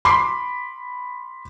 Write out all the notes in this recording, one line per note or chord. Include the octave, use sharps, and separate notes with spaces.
B5 C6 D6 C7